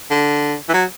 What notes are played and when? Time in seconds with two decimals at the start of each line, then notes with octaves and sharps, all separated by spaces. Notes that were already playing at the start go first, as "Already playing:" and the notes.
0.10 D3
0.69 E3
0.74 F#3